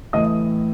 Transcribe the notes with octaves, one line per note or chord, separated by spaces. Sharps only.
A2 E3 A3 D#5 D#6